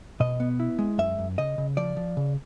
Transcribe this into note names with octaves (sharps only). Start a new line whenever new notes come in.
B2 D#5
B3
E4
G#3
F#2 E5
F#2
C#3 D#5
C#3
F3 D5
F3
C#3